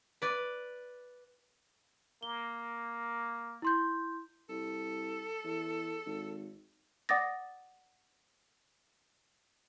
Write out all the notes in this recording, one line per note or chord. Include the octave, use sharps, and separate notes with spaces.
B4 D5
A#3 G7
E4 C6 G6
C2 A4
E2
G#1
D5 F#5 D6 D#6 A6 A#6